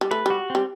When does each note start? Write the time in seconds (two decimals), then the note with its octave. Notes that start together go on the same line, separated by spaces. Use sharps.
0.01 G3
0.11 A3 B4
0.26 G3 F#4
0.50 G3 C4